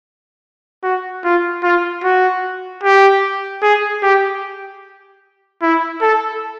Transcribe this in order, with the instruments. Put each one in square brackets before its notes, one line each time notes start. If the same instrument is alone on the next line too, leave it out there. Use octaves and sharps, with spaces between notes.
[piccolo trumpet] F#4
F4
F4
F#4
G4
G#4
G4
E4
A4